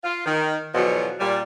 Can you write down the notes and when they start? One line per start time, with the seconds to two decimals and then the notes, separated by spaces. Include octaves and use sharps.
0.04 F4
0.25 D#3
0.74 E2 B2 D3 F3 F#3
1.19 A#2 G3